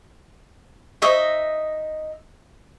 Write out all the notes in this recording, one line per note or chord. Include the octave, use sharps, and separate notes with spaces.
D#4 C5 D#5 E5 C#6